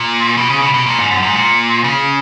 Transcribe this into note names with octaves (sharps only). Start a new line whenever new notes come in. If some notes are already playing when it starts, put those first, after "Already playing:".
Already playing: A#2
B2
C#3
B2
B2
A#2
G#2
F#2
G#2
A#2
C#3